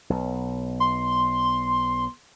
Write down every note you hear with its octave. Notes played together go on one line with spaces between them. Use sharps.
B1
C6